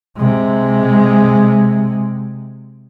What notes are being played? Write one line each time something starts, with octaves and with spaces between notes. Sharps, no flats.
C3 G#3